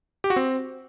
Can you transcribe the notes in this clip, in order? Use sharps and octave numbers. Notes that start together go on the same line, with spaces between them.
G4
F#4
C4